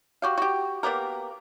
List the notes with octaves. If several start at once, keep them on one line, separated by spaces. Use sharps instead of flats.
F#4 G4 F5
F#4 G4
A#3 B3 G4 A#4